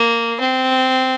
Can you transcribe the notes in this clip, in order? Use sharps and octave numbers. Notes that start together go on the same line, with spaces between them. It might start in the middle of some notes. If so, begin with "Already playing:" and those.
Already playing: A#3
C4